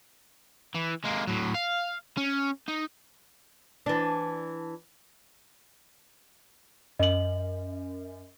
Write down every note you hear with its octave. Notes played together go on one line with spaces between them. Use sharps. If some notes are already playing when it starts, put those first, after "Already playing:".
E3
G#3 A#3
A2 F#3
F5
C#4
D#4
E3 D4
F#2 D#5 F#7